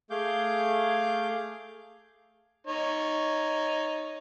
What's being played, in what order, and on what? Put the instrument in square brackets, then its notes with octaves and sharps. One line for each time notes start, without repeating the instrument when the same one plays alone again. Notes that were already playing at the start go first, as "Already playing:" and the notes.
[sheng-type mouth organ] A3 G#4 F5 D6 G6
[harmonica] D#4 C#5